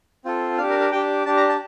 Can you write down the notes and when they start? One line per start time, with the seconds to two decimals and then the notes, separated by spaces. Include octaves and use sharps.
0.25 C4 F4 A4
0.58 D4 G4 F5
0.70 A#4
0.81 A#4
0.92 D4 G4 G5
1.25 D4 G4 A5
1.37 A#5
1.49 A5